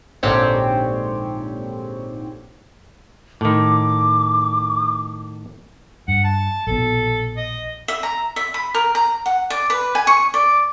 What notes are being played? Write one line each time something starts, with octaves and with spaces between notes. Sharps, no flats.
A#1 G#2 D3 C4 G4 C#5
A2 D#3 D6
G2 F#5
A5
A#1 B2 A4
D#5
E5
A#5
E5
B5
A#4
A#5
F#5
D5
B4
G#5
C#6
D5